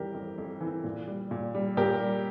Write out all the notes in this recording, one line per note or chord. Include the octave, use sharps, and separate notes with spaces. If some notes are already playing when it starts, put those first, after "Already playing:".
Already playing: F2 E3 G3 G4 A#4
F2
F2
E3
A#2
G3
A#2
G3
A#2 G4 A#4
G3